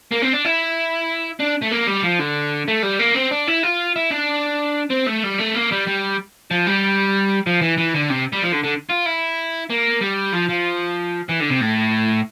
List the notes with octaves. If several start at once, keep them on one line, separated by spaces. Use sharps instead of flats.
A#3
C4
D4
E4
D4
A3
A#3
G3
F3
D3
A3
G3
A#3
C4
D4
E4
F4
E4
D4
C4
A3
G3
A3
A#3
G3
G3
F3
G3
F3
E3
E3
D3
C3
G3
F3
D3
D3
F4
E4
A#3
G3
F3
F3
E3
D3
C3
A2